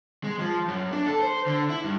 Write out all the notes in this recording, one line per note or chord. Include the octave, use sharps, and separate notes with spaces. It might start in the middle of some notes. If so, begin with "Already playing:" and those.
G#3
F3
F#2
D4
A4
C5
D3
E4
G2